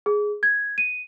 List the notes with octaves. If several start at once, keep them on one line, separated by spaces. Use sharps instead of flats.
G#4
G#6
D#7